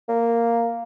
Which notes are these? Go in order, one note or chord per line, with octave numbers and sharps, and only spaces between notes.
A#3